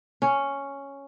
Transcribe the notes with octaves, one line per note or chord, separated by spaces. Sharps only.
C#4